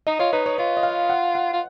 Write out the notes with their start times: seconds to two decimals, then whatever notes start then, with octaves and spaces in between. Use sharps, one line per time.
0.07 D#4 D#5
0.19 F4 C#5
0.32 D#4 B4
0.46 C#5
0.58 F4 C#5
0.77 D#5
0.83 F5
1.10 F#5
1.35 F#5
1.53 F4